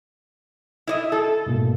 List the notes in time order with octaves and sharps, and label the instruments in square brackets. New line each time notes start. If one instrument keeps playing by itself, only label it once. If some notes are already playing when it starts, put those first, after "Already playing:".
[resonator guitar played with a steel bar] E4 D5 D#5
A4
[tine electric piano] G#2 B2 A#3